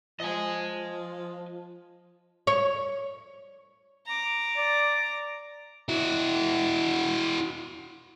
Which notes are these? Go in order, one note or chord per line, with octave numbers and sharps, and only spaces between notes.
F3 D#5 G#5
C#5
A#5 D6
D5
E4 F#4